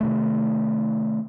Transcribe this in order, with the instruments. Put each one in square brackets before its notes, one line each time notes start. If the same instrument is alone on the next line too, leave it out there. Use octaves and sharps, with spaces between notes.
[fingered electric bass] C3 D#3 A3